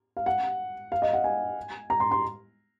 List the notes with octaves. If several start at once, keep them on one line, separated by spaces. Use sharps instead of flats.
F5
F#5
F5
D#5
F#5
G#5
A#5
C6
C6